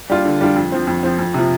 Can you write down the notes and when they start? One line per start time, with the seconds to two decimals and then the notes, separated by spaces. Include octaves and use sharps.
0.10 G3 D4 F4
0.25 D3
0.41 G3 D4 F4
0.56 F2
0.72 F3 C4
0.87 F2
1.03 F3 C4
1.19 F2
1.34 C3 F3